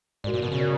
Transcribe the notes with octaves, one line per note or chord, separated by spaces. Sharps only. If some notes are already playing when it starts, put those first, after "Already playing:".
G#2 F#4 A#4 D5
A#2
B2
C#3
F#4 A#4 D5